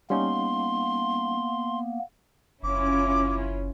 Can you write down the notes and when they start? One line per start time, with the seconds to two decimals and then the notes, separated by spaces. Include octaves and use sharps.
0.10 G3 A#3 B3 C#4 D#4 C6
2.63 F#1 C#4 E4 F4 D6